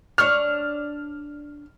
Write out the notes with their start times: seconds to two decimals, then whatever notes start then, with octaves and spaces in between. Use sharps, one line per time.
0.18 D4 C#5 F6